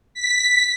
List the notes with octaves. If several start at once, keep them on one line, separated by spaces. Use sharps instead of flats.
B6